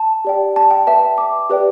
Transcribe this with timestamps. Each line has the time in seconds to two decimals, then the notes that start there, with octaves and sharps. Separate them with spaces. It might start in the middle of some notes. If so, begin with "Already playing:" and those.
Already playing: A5
0.25 G4 D5 G5
0.56 A5
0.71 G5
0.87 B4 E5 G5 A5
1.18 D6
1.50 G4 B4 D5 G5